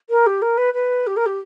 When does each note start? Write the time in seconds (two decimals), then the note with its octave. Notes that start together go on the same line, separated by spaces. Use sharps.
0.10 A#4
0.26 G4
0.42 A#4
0.57 B4
0.74 B4
1.07 G4
1.16 A#4
1.26 G4